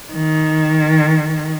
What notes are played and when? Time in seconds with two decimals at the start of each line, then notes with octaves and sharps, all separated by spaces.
0.13 D#3